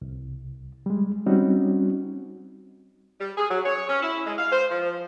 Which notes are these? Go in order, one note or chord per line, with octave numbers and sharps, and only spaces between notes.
C2
G3 G#3
G3 C4 C#4 D#4 F#4
G3
G#4
F#3
C#5
C#4
E4
G#3
F5
C5
F3